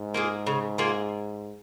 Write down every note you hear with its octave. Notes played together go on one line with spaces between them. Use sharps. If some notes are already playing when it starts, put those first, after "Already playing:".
Already playing: G#2
A#3 F4 G#4
C#3
A#3 F4 G#4